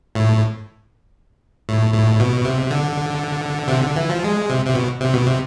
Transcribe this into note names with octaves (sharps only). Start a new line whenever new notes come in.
A2
A2
A2
B2
C3
D3
C3
D3
E3
F3
G#3
C3
C3
B2
C3
B2
C3